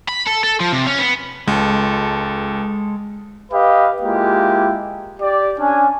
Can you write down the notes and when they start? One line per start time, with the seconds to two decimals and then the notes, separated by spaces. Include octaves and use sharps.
0.08 B5
0.27 A4
0.44 A4
0.60 F3
0.72 C3
0.87 C#4
0.98 B3
1.48 C#2 G#3 A4
3.51 G4 B4 D#5 F5
4.02 G#3 A#3 E4 F4 G4
5.21 G4 D5
5.58 C#4 D4 G#5